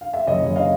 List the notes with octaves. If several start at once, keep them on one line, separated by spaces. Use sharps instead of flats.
F5
E5
F#1 C#5 D#5
F#1
D#5 F5